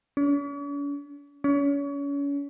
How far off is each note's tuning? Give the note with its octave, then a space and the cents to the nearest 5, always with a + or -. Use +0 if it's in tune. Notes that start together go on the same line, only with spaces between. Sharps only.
C#4 +45
C#4 +35